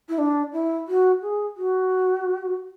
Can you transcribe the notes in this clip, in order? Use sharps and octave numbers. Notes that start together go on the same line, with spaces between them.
E4
D4
E4
F#4
G#4
F#4